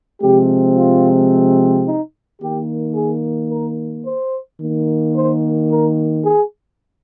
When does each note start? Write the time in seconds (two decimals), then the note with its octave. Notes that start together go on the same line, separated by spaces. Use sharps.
0.21 C3 F3 G#3 C4 G4
0.76 F4
1.86 D#4
2.41 D#3 A#3 G4
2.95 G#4
3.50 A#4
4.05 C5
4.60 D#3 A#3
5.15 C5
5.70 A#4
6.24 G#4